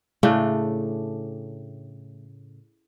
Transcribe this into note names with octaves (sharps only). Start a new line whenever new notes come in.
A2 C#3 A3 D4